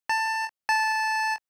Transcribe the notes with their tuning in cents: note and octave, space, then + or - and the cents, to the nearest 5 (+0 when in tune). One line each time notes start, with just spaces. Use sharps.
A5 +15
A5 -10